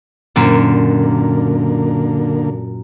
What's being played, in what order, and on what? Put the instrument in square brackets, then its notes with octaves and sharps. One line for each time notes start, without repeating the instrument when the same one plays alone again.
[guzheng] F#2 A#2 [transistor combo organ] D3 A#3